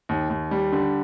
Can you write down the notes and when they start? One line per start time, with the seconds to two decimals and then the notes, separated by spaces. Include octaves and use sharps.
0.09 D#2
0.30 D#2
0.51 G3
0.72 D3